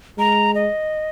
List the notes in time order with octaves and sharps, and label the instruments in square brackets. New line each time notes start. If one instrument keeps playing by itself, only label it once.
[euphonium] G#3 [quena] A#5
[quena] D#5